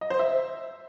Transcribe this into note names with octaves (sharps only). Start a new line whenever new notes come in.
D#5
C5
E5